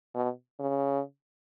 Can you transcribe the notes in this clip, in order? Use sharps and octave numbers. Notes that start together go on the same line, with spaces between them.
B2
C#3